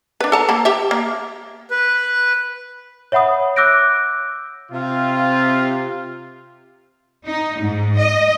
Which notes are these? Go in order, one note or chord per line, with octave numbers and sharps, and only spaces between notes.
D4 B4
A4 A5 A#5
A#3 A5 B5
G4 E5
A#3
B4
C#5 E5 F#5 B5 D#6
D6 E6 F#6 G6 A#6 D7
C3 F4
D#4
G#2
D#5